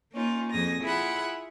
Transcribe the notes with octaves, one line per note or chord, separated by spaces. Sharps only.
A#3 C#4 D#4 F4
F2 G#4 D#6 A#6
E4 F4 G#4 F#5 B5